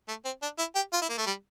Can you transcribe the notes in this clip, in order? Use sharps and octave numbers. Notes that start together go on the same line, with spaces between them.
A3
C4
D4
E4
G4
F4
E4
A#3
A3
G3